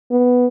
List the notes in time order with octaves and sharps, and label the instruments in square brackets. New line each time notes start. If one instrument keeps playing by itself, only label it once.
[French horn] B3